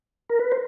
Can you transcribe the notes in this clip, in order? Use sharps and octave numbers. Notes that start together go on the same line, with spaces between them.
A#4
B4
C5